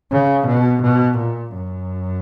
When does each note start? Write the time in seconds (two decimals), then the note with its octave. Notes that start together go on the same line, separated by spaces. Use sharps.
0.12 C#3
0.47 B2
0.82 B2
1.18 A#2
1.54 F#2